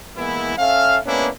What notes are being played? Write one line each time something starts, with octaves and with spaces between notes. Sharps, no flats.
E3 G#3 A#3 B3 E4
C#4 A4 E5 F5
G#3 A#3 B3 C#4 D4 E4